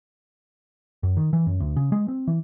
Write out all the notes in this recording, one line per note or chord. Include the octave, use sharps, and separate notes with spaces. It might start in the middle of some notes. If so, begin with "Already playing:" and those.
F#2
D#3
E3
F#2
D2
C#3
G#3
C4
E3